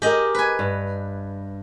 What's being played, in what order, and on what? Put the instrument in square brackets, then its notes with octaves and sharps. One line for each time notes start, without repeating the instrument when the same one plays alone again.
[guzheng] G4 D#5 [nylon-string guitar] G#4 A#4
[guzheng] B4 G#5
[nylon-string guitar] G2